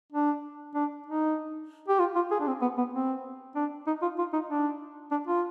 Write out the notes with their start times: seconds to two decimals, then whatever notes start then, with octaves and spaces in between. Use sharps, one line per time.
0.12 D4
0.75 D4
1.06 D#4
1.88 G4
1.99 F4
2.15 F4
2.31 G#4
2.40 D4
2.47 C4
2.62 B3
2.78 B3
2.93 C4
3.55 D4
3.87 D#4
4.02 F4
4.19 F4
4.33 D#4
4.49 D4
5.11 D4
5.27 F4